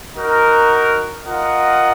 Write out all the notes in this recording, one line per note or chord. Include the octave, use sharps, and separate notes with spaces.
D#4 F#4 A#4
F4 A#4 D#5 F#5